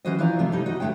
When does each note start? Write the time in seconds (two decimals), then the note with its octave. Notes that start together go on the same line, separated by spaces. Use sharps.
0.05 E3 F#3 C#4 F#4 C5 D#5
0.18 E3 F3 E4 D5 A#5
0.39 C3 A3
0.52 G3 D#4
0.66 F#4 D#5
0.80 B2 D3 A3 C#5 G5